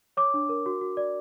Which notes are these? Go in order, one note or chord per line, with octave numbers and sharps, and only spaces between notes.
C#5 D6
D4
A#4
F#4
F#4
D5